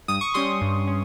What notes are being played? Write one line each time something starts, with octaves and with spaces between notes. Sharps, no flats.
G2 D#6
C#6
G3 C#4 C6 D#6
G2
C#4